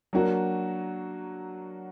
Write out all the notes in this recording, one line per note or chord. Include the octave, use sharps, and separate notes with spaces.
F#3 A#3 D4 F#4